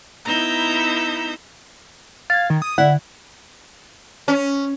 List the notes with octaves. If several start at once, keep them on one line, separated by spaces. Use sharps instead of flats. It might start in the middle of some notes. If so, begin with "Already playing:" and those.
B3 D#4 E4 A#5 E6 G6
F5 G#6 A6
D#3
D#6
D3 E4 D5 F#5
C#4